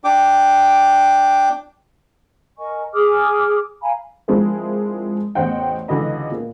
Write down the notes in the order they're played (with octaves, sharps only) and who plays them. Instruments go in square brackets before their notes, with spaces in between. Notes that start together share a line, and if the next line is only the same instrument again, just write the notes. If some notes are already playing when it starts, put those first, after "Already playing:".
[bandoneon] D4 G5 D6
[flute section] A#4 D#5 G#5 C#6
G#4 D6 D#6 F6
F5 G#5 A#5 B5
[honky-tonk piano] F3 G#3 C4 D4 E4 A#4
A1 E2 C5 D#5 F#5 G5
C#2 D3 E3 F#4 D#5 B5
A#2 A#3